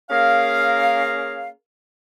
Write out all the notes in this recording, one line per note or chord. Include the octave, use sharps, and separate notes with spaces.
A#3 C#4 G#4 A#4 F5